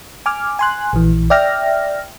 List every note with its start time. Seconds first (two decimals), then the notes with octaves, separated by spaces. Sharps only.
0.26 G#5 D6 F6
0.59 G#5 C6 F#6
0.93 A#1 E3
1.30 D5 E5 G5 F6 A#6